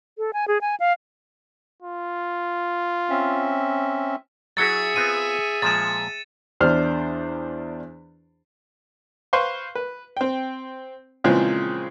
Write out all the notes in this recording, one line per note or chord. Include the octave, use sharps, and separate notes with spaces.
A4
G#5
G#4
G#5
F5
F4
C4 C#4 E5
F#3 E4 F#4 G#4 E5 A6 C#7
B3 C4 F4 D#7
A#2 F3 G#3 A6 E7
E2 D4 C5 F6
B4 C5 F5 C6 C#6
B4
C4 G5
A#2 C#3 E3 F3 G#3 C4